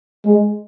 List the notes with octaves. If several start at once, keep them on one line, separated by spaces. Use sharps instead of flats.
G#3